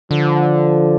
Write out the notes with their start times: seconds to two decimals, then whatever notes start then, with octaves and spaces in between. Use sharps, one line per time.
0.11 D3 F3